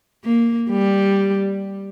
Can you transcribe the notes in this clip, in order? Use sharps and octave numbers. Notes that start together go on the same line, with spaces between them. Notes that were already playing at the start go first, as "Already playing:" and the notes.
A#3
G3